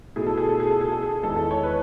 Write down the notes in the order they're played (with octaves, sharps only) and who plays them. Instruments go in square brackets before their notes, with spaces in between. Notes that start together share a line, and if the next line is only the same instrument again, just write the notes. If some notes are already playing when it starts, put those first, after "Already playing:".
[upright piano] B2 A3 E4 [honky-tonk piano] G#4
[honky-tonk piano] A4
G#4
A4
G#4
A4
G#4
A4
G#4
[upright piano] E2 D#3 G#3 [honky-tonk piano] A4
[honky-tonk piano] A4
C#5
B4